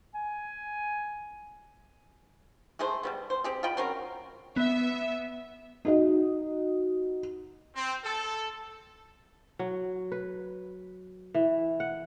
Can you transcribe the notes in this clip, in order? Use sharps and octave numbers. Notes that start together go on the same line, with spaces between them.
G#5
G#3 A3 G#4 C5
G3 G#3 B3
C5
C4 G4 G#4
F4 D#5 G5 B5
F#3 C4 C#4 A#4
B3 E5
D#4 F#4 D#5
C4
A4
F#3
B4
E3
F#5